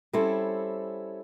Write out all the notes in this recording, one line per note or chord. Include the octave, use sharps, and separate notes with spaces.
G3 C4 C#4 E4 A4